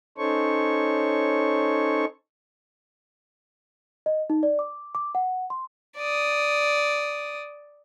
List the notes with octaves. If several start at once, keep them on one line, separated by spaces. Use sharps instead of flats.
C#4 D#4 A4 C5 C#5 C#6
D#5
D#4
D5
D6
D6
F#5
C6
D5 D#6